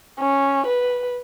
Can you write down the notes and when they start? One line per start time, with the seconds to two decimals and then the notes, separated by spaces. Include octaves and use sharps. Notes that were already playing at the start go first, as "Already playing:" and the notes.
0.20 C#4
0.67 B4